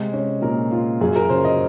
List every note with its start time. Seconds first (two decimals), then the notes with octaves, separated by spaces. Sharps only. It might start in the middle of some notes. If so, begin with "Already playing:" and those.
Already playing: C3 G#3
0.13 C#4
0.42 A#2 A#4
0.72 F4
1.01 F#2 G#4
1.16 A#4
1.29 C#3 C5
1.45 D#5